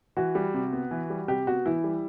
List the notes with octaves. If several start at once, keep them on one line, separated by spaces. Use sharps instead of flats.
E3 F#4
G3
C3
B3
E3
G3
C3 G4
B3 F#4
E3 E4
G3